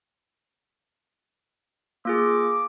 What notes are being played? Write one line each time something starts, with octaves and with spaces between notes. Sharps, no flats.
A#3 F4 G#4 D6